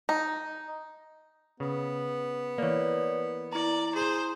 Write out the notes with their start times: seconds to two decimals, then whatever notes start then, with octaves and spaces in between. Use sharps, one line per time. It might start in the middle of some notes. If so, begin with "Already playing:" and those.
0.09 D#4
1.60 C#3 B3
2.58 E3 A#3 C#5 D5
3.53 E4 D5 A#5
3.95 G#4 C5